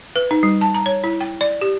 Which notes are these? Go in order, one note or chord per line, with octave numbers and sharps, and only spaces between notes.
B4
D#4
G3
A5
A#5
C#5
E4
G5
D5
G4